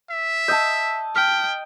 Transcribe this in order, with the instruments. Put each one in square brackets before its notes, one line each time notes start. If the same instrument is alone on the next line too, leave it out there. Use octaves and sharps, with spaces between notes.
[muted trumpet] E5
[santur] D#5 A5 [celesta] E6 G6
[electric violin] G5 [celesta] F6 B6